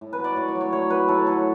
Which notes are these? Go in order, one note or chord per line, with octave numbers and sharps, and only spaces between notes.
A2
B4
F#3
D5
A2 C#5
D5
F#3
C#5
A2 C#5
F#3 B4
A2 A4
F#3 A4